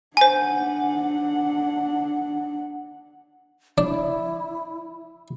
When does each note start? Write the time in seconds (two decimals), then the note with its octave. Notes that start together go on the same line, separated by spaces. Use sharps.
0.17 D4 C5 F#5 G#5
3.78 D4 E4